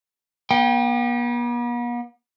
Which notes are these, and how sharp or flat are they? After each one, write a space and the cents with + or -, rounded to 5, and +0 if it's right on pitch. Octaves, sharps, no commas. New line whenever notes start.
B3 -45 G5 +0